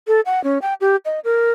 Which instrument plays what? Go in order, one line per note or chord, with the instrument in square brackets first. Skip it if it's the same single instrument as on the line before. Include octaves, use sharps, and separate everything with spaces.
[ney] A4
F#5
C#4
G5
G4
D#5
A#4